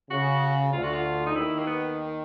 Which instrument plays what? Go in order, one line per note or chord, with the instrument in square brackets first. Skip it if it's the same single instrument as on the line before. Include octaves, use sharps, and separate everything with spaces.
[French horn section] C#3 [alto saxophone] F#4
[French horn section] D2 D3 [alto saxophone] F4
[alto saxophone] F#4
F4
D#4
[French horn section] D#2 D#3 [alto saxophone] E4
[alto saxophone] A#3
B3